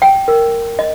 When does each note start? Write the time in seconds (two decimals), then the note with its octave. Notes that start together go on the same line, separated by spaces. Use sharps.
0.02 G5
0.28 A#4
0.79 D#5